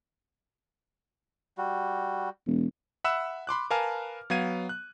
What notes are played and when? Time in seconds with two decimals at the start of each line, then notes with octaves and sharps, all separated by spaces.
1.58 G3 F#4
2.47 E1
3.04 E5 F#5 B5 E6 F#6 E7
3.47 B5 C6 D6 F#6
3.71 A#4 B4 F5 G#5 A5 F6
4.30 F#3 B3 F5 G#6 D#7
4.69 F#6